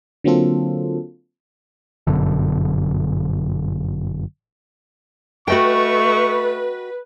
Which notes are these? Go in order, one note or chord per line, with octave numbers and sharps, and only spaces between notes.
D3 F#3 A#3 C4 F4 A4
G1 F#2 B2 D3
A3 F#4 B4 D#5 G5 C#6